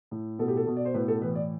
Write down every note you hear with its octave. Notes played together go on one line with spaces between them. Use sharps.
A2
B2 A4
G4
A4
B2
D5
C5
A2 B4
A4
E3 B4
D5